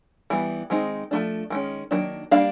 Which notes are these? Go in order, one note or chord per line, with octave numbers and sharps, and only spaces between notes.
E3 G3 B3
D#3 G#3 C4 D#4
F3 A3 D4
D#3 G#3 C#4
D#3 F#3 A#3 D4
G3 A#3 D4 F5